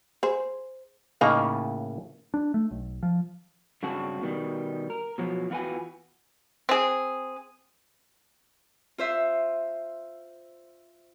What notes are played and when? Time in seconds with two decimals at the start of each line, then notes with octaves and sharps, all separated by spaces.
0.23 G#4 C5
1.21 A2 C#3 A#3 D#4 G#4 F5
2.34 D4
2.54 A3
2.71 B1
3.03 F3
3.83 G2 C#3 F#3 C4 F#4 A5
4.22 B2 D#3 G3
4.90 A#4
5.18 B2 F3 F#3
5.50 E2 F4 F#4 B4 G5 G#5
6.69 C4 G#4
8.98 F4 C5 E5